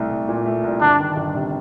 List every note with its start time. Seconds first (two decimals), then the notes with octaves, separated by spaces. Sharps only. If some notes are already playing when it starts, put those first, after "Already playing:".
Already playing: C2 A3
0.10 C2
0.28 A#2
0.46 A3
0.63 C2
0.81 G1 D4
0.99 D#3
1.16 G1
1.34 C3